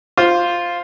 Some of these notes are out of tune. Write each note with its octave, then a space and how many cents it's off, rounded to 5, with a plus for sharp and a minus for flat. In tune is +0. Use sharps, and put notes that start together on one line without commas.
F4 +0 C5 +0